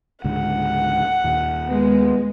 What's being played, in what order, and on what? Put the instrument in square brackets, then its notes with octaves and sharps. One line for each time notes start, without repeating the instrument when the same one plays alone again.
[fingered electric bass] C#2 G#2 D3 [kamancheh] F#5
[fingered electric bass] D#2 A#2
[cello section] G#3 [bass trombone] B3